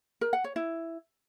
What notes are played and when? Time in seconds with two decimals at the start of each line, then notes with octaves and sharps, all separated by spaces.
0.21 A#4
0.33 F#5
0.44 C#5
0.56 E4